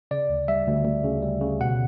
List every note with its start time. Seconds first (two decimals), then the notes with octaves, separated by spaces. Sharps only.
0.11 C#3 D5
0.29 D2
0.48 G3 E5
0.67 D2
0.85 D2
1.04 C#3
1.22 G3
1.41 C#3
1.61 B2 F#5